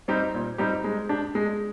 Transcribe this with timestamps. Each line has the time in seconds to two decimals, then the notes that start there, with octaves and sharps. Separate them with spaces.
0.08 G3 C4 D#4 G4
0.34 A#2
0.58 G3 C4 D#4 G4
0.84 G#3
1.09 D4 G4
1.35 G#3